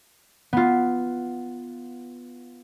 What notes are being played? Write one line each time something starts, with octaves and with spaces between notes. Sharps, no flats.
B3 F4